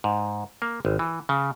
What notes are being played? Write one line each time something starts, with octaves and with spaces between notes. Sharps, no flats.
G#2
A#3
G#1
E3
C#3